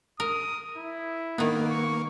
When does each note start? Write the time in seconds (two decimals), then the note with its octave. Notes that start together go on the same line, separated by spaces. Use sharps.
0.20 A#4 D#6
0.77 E4
1.38 D#3 A#3 B3
1.71 C#6